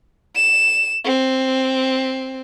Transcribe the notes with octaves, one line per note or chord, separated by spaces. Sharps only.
E7
C4